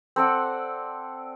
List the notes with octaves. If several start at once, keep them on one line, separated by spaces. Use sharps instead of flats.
C4 A4 D5 F#5